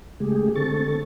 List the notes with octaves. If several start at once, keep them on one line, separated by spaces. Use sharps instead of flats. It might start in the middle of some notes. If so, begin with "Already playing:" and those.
C#3 G#3 A3 G4 G#4
D3 C4 A4 C#6 A6